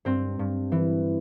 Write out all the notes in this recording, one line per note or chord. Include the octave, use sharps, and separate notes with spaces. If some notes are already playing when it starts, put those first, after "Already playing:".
G2 C4
G2
E3